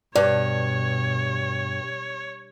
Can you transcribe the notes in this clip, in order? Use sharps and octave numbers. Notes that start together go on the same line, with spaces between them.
G2 B2 C#5 D5